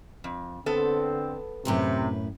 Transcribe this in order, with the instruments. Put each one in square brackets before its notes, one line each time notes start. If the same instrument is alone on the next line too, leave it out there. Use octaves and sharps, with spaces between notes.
[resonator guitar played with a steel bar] F2
[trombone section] D3 C4 [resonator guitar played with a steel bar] B3 A4
[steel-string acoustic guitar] F#2 A2 B4 [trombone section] C3